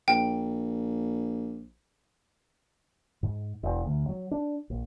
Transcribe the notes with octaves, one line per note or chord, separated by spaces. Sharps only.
A#1 G5
G#2
E1
D2
F#3
D4
A#1